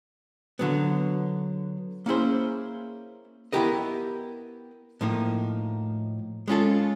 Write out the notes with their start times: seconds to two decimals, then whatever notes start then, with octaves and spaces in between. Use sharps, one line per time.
0.59 D3 F#3 B3
2.06 A#3 C#4 E4 G#4 C5
3.53 B3 E4 G4 A#4 D#5
5.01 A2 F3 A#3 D#4
6.48 G#3 C#4 F4 A4